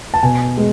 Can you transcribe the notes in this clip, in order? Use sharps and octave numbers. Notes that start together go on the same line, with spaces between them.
A5
B2 G#5
G#3